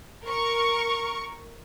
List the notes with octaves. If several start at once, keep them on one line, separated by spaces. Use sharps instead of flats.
A#4 C#6